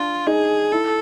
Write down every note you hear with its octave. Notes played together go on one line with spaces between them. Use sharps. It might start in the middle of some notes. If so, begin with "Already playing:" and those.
Already playing: D4 F4
D#4 G#4
E4 A4